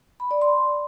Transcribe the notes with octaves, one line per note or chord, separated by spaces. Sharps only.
B5
D5
C6